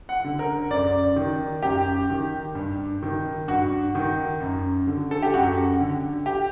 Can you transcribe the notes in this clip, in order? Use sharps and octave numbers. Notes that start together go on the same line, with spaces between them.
F#5
D3
A#4
F#2 D5
D#3
F#2 G4
D#3
G2
D#3
G2 F#4
D#3
F#2
D3
A4
G4
F#2 F#4
D3
G4